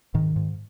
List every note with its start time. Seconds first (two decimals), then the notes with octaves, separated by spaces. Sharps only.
0.14 G#2 D#3
0.36 G#2